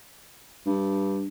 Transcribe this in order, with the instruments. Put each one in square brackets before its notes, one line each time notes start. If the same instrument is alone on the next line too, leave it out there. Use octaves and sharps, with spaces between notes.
[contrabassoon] G2